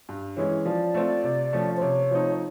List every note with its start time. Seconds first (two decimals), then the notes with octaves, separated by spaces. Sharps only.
0.09 G2
0.37 E3 G#3 C#4 E4 C#5
0.65 F3 D5
0.94 A3 C4 F4
1.24 C3
1.53 F3 A3 C#4
1.77 C5
1.82 C3 C#5
2.11 F3 A3 C4 D#4